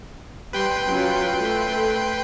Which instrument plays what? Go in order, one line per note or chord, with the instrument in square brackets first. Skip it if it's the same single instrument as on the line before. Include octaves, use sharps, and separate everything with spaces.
[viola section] G3 [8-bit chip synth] B4 G5 C6
[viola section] F#3 C#4 F4
A3